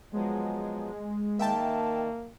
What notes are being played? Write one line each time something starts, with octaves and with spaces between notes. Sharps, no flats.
F3 F#3 G#3 B3
D#3 A#3 E5 G5 A5